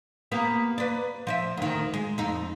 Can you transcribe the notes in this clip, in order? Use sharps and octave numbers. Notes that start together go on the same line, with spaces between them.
A#3 B3 G4
B4 D5
F3 D5 E5
D2 D#3
G#3
F2 D#4